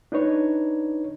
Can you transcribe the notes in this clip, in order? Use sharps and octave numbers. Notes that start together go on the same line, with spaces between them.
D4 D#4 B4 C#5